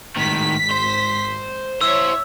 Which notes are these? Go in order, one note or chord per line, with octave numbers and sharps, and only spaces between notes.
G#1 A2 D#3 B6
C5
E4 C5 C#5 E5 E6